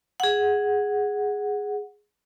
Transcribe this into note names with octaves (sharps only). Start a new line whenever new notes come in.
G#4 F#5